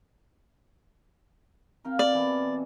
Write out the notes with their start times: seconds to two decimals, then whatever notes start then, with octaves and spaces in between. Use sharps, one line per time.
1.84 C4 A#4 F5 G5
1.99 B2 D5
2.13 E3 G#4 A4